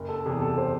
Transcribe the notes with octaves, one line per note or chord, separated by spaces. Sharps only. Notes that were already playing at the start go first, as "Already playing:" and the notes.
Already playing: F#1
A4
E2 C3 G#4
A4
C5